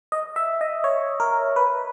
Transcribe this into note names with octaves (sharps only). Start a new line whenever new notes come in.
D#5
E5
D#5
C#5
A#4
B4